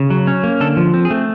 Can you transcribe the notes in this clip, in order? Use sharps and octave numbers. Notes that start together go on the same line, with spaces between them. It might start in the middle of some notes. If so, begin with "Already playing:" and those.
Already playing: C#3
F#3
C#4
A#3
D3 A4
F3
C4
G#4
A3